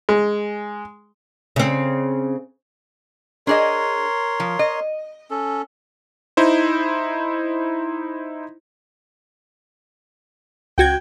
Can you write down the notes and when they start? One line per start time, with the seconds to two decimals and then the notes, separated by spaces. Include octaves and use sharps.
0.09 G#3
1.56 C#3 C4
3.47 D4 G#4 A#4 C#5 D#5 C6
4.40 F3
4.59 D#5
5.31 C#4 A4
6.37 D#4 E4 C5
10.78 C#2 F#4 G5 G#6